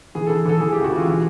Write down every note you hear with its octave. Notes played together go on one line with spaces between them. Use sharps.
E3 G#4
E3 A4
E3 A4
A4
E3 G#4
C#2 G4
F#4
E3 F4
E3